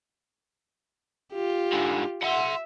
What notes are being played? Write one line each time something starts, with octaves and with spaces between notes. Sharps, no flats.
F4 G4
G#2 D3
E5 F#5 C6